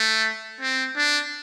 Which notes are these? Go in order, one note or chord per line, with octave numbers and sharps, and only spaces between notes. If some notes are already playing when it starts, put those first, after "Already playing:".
Already playing: A3
C4
D4